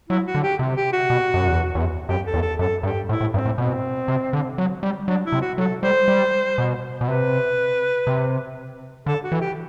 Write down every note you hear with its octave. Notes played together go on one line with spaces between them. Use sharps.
F#3 E4
F#4
D3
G4
C3
G4
F#4
B2
F#2
E2
E2
F#2 G4
A4
E2
A4
F#2 A4
G2 G4
A2 E4
A2
G2 C4
A2
B2 C4
C3
D3
F#3
G3
F#3 D4
E4
C3
F#4
F#3 A4
G3 C5
G3
B2
B2
C3 B4
C3
D3 A4
F#4
E3
G4